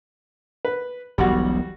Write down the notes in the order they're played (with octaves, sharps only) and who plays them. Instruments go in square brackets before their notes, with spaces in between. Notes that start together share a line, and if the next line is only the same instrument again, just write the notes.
[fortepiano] B4
[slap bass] E1 B1 [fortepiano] G3 F#4